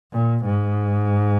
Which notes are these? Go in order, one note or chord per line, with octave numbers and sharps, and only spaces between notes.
A#2
G#2